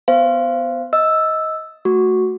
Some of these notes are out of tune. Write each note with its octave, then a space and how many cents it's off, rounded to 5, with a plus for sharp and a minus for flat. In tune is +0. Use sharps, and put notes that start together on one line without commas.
B3 +15 C5 +0 F5 -25
D#5 +20 E6 +0
A3 +0 F#4 +0 C#6 +0